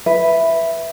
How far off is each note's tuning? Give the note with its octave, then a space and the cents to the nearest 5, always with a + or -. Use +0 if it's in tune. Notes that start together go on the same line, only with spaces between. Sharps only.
B4 +0 E5 +0